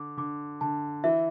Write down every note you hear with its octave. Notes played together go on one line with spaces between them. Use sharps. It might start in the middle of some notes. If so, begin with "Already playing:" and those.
Already playing: D3 D6
D3 D6
D3 A5
E3 E5